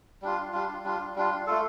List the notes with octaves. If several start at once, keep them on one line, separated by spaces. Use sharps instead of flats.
G3 D4 F4
G3 D4 F4
G3 D4 F4
G3 D4 F4
A3 F4 A4